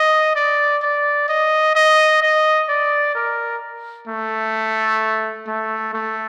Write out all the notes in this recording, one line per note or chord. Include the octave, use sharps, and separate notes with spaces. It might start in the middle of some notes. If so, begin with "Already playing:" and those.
Already playing: D#5
D5
D5
D#5
D#5
D#5
D5
A#4
A3
A3
A3